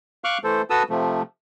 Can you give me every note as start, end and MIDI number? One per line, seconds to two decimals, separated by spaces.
0.24 0.38 77
0.24 0.38 85
0.24 0.38 86
0.24 0.38 89
0.24 0.38 90
0.44 0.62 52
0.44 0.62 57
0.44 0.62 69
0.44 0.62 72
0.70 0.83 66
0.70 0.83 69
0.70 0.83 71
0.70 0.83 81
0.70 0.83 87
0.70 0.83 88
0.89 1.22 48
0.89 1.22 53
0.89 1.22 57